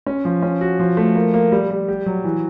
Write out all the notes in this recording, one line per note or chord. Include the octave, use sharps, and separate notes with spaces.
C#4
F3
C#4
F#4
F3
A3
A#3
A#3
G3
G3
G4
F#3
E3